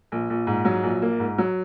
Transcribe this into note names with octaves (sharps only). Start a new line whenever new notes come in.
A#1
A#1
G#2
F#3
A#1
A#3
G#2
F#3